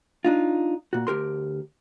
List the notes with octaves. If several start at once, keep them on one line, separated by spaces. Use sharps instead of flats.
D4 D#4 F4
A#2 F#4
D2 G4 A#4 C6